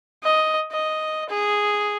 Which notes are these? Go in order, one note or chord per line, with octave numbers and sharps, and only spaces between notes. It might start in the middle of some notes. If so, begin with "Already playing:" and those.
D#5
D#5
G#4